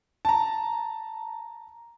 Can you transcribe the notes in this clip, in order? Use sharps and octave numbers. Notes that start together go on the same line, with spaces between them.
A5 A#5